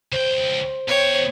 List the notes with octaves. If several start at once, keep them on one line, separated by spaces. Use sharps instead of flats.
C#2 C5 G5
B2 C#5 G5